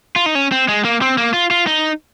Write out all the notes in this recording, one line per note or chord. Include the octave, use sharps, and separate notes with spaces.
F4
D#4
C#4
C4
G#3
A#3
C4
A#3
F4
F4
D#4